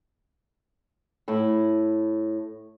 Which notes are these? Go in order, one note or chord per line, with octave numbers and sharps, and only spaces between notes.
A2 E4